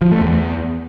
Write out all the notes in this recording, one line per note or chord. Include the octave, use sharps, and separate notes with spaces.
F3
A3
E2